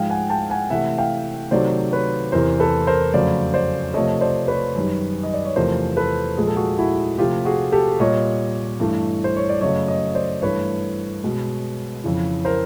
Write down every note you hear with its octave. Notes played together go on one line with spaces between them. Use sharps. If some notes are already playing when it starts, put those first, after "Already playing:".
Already playing: G#2 F3 G#3 F5 G5
F#5 G#5
G5 A5
F#5 G#5
C3 E3 A3 E5 F#5
F5 G5
C3 D#3 F#3 A3 C5 D5
B4 C#5
E2 C3 E3 A#4 C5
A4 B4
A#4 C5
F2 C#3 F#3 A3 C5 D5
C5 D5
C3 F3 A3 C#5 D#5
C5 D5
B4 C#5
F#2 D#3 G3
D#5
D5
C#5
E2 C3 F3 A3 A#4 C5
A4 B4
A#2 F3 G#3 G#4
A4
F#4 G#4
E4 F#4
C3 F3 A3 F4 G4
F#4 G#4
G4 A4
A#2 G3 C#5 D#5
G2 E3 A3
C5
C#5
D5
F#2 C#3 F#3 A3 C#5 D#5
C#5 D#5
C5 D5
G2 E3 A3 B4 C#5
B2 G#3
F2 C#3 E3
A#4 C5